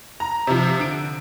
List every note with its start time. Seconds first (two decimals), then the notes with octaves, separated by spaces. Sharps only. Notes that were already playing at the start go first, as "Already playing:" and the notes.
0.20 A#5
0.47 C3 F3
0.79 D3 D7